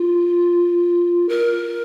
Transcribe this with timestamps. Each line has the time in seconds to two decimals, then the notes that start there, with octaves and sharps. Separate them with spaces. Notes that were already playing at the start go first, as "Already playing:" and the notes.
Already playing: F4
1.29 A#4